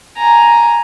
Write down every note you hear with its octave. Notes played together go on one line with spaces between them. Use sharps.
G#5 A#5